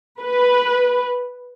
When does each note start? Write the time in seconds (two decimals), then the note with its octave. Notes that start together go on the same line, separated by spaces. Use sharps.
0.20 B4